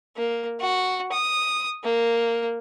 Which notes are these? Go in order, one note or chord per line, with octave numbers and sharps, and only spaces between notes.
A#3
F#4
D#6
A#3